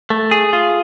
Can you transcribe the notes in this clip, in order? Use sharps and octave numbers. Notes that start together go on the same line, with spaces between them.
A3
G#4
F4